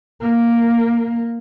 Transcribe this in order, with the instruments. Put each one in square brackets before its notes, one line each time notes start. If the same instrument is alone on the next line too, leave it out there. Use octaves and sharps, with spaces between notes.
[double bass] A#3